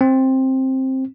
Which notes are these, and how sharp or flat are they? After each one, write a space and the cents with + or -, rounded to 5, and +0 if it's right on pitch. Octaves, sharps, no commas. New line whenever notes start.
C4 +10